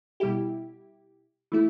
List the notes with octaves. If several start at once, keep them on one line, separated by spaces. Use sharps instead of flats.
B2 G3 E4 G4
E3 A3 E4